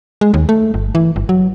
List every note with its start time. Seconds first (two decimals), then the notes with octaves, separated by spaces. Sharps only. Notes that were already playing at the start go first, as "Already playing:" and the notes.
0.21 G#3
0.34 D#2
0.49 A3
0.74 G1
0.95 E3
1.16 G1
1.29 F#3